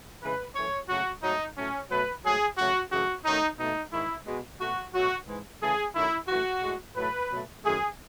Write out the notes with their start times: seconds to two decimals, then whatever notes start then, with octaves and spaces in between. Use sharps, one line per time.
0.22 C#3 E3 G#3 B4
0.55 F#2 E3 A3 C#5
0.89 C#3 F#3 A3 F#4
1.23 G#2 F#3 A3 D#4
1.57 A2 F#3 A3 C#4
1.90 B2 F#3 A3 B4
2.24 G#2 F#3 A3 G#4
2.58 C#3 F#3 A3 F#4
2.91 F#2 C#3 E3 A3 F#4
3.25 F#2 D#3 F#3 A3 D#4
3.59 B2 A3 D#4
3.92 G#2 D#3 G#3 E4
4.27 B2 G#3
4.60 B2 A3 F#4
4.94 B2 F#3 A3 F#4
5.27 G#2 E3 G#3
5.61 C#3 E3 A3 G#4
5.95 F#2 D#3 F#3 A3 E4
6.28 F#2 E3 A3 F#4
6.62 A2 G#3
6.96 A2 F#3 A3 B4
7.29 B2 F#3 A3
7.64 F#2 D#3 A3 G#4